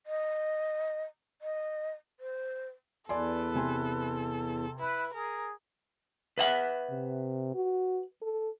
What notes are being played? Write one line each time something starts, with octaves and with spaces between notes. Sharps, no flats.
D#5
D#5
C5
E2 A4 B4 D5 G#5 C6
C3 G#5 C6
E4 B4
G#4 A#4
B4 E5 F#5
C3
F#4
A4